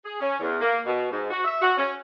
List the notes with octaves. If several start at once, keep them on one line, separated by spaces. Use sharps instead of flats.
G#4
C#4
E2
A#3
B2
G#2
F#4
E5
F#4
C#4